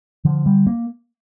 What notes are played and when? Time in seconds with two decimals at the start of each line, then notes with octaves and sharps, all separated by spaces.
0.25 D3 F3
0.46 G3
0.67 A#3